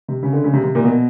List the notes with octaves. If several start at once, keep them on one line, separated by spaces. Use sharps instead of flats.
C3
C#3
D3
C#3
C3
C3
A#2
B2